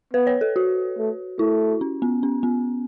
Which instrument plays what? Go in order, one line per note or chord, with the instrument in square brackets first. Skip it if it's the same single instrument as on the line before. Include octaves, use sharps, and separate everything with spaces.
[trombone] B3 [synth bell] B4
[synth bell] C#5
A4
F#4
[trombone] A3
[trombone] A3 [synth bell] E4
[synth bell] C#4
B3
C#4
B3